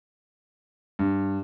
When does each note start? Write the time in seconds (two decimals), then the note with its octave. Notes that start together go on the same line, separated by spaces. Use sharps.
0.99 G2